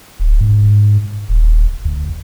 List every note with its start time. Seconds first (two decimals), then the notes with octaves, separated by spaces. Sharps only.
0.20 D1
0.41 G#2
1.29 D#1
1.85 D2